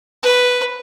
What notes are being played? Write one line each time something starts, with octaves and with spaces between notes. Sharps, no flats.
B4